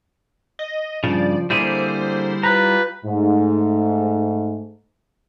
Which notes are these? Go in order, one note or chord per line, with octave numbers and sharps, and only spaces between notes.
D#5
G2 C#3 F3 D5
D3 G3 A#3 E4 G#4 C5
F4 G4 B4 A#5
G#2 A3